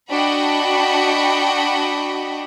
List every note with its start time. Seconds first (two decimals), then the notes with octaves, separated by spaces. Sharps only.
0.10 D4 F#4 D#5 G5 B5